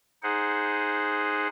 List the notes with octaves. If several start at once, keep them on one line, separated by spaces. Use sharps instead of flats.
D#4 G#4 C5 F#5